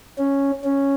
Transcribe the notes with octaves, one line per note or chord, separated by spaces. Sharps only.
C#4
C#4